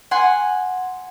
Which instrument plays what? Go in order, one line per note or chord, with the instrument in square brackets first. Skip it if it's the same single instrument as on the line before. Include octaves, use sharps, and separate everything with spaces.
[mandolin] F#5 G#5 C6